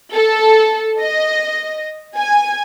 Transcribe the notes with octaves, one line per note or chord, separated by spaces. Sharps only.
A4
D#5
G#5